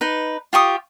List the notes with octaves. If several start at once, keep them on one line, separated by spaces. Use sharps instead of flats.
D#4 B4
F4 G4 C#6 D#6